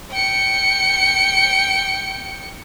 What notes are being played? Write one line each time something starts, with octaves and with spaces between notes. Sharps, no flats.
G5 C#7